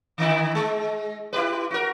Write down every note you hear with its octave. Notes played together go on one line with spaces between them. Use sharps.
D3 D#3 E4
G#3
E4 G4 B4
F#4 A#4